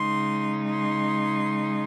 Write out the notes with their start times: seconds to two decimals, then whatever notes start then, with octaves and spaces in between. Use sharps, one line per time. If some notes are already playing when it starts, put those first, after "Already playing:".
Already playing: C#3 G#3 D#4 C6
0.70 C6